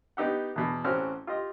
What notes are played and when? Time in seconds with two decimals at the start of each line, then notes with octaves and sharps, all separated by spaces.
0.17 B3 D#4 G4 F#5
0.56 E2 B2
0.84 A1 C4 C#4 F#4 F6
1.27 F4 G4 D#5